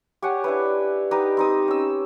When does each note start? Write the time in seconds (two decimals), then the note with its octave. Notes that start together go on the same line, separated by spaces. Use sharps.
0.22 G4 C#5 F#5 G#5
0.44 D4 E4 B4
1.11 D#4 G4 B4 D#5
1.37 C4 D#4 D#6
1.68 C#4 E6